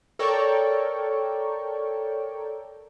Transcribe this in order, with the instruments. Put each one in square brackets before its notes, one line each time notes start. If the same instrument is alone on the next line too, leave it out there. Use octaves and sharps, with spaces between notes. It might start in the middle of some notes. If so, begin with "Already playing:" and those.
[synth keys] A4 A#4 C#5 D5 G5 C#6